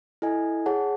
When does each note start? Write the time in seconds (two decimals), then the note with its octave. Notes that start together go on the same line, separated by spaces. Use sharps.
0.22 E4 A4 D#5 G#5
0.66 G#4 C#5 F#5 A5